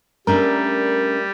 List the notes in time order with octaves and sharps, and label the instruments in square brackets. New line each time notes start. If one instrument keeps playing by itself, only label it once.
[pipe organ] G3 [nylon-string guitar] A3 C#4 D4 [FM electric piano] A#4